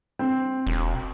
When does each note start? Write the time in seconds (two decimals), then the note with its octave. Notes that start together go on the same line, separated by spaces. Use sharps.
0.19 C4
0.67 E1